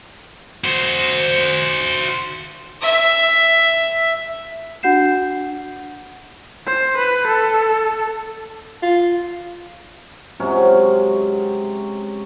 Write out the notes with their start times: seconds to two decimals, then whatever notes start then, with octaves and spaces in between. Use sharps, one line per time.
0.64 F#4 C5
2.81 E5
4.83 D4 F#4 F#5 G6 C7 E7
6.66 C5
6.97 B4
7.27 A4
8.83 F4
10.40 C3 F#3 G#3 C#4